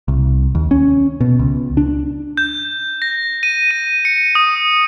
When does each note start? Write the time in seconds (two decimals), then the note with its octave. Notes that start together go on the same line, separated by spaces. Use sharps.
0.08 C2
0.55 D#2
0.71 C#4
1.21 B2
1.39 C#2
1.77 D4
2.37 G6
3.02 A#6
3.43 D#7
3.71 D#7
4.05 C#7
4.35 D#6